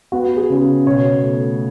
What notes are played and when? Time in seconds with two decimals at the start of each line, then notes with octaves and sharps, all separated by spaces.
0.12 B3 F#4
0.37 G#4
0.50 C#3
0.87 B2 C#5
1.23 A3